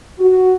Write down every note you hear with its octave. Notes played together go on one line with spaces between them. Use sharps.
F#4